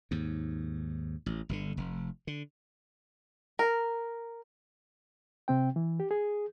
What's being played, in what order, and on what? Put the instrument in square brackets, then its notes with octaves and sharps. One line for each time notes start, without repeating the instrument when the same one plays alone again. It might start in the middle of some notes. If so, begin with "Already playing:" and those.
[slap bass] D#2 G#2
A1
G1 B2 D3
F1
D3
[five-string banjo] A#4
[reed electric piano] C3 C4 G5
E3
G4
G#4